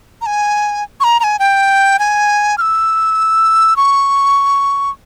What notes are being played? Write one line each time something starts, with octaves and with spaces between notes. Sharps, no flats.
A#5
G#5
C#6
A#5
A#5
G#5
G5
G#5
F6
E6
C#6